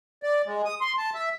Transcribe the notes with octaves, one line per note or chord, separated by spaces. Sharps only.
D5
G#3
D#6
C6
A5
E5